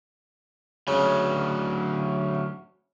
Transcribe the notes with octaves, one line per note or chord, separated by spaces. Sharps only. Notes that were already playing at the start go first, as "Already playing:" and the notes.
D2 C#3 F#3